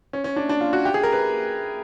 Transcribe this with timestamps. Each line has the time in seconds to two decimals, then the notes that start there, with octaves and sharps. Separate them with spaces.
0.13 C#4
0.24 C#4
0.36 D4
0.49 D4
0.61 F4
0.73 F#4
0.85 G4
0.94 G#4
1.03 A#4
1.12 B4